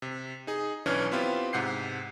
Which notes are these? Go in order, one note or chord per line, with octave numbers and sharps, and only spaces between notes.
C3
D#4 G#4
B1 E3 C#4 D4 C#5 F6
B3 C4 E4 F4 G4
G#2 C3 F#5 G6 C7